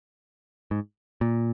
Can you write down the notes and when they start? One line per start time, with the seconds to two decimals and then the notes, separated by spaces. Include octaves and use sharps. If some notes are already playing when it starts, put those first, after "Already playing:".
0.71 G#2
1.21 A#2